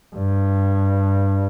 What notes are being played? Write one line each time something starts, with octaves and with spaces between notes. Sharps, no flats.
G2